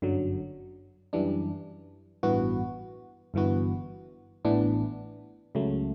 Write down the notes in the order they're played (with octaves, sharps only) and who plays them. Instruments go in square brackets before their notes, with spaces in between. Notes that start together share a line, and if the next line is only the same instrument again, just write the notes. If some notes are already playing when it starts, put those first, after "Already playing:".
[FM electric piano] G1 F#2 D3 F#3
F#2 E3 G3 D4
A1 G2 E3 B3 F#4
G1 G2 E3 B3 F#4
A1 A2 E3 B3 D4
C#2 C#3 F#3 A3